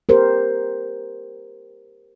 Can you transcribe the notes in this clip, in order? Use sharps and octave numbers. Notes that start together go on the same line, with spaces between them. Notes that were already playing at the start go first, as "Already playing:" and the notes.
G4 A#4 C5